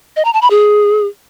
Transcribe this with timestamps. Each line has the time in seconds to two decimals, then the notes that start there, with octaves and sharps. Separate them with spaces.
0.16 D#5
0.25 A#5
0.33 A5
0.42 B5
0.50 G#4